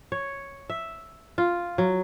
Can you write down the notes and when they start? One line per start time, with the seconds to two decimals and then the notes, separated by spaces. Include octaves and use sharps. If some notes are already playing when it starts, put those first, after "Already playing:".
0.12 C#5
0.70 E5
1.38 F4
1.78 F#3